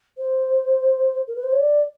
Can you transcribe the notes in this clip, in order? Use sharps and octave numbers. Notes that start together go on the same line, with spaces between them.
C5
A#4
B4
C5
C#5
D5